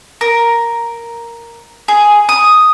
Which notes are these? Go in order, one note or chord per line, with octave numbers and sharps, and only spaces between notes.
A#4
G#4
D#6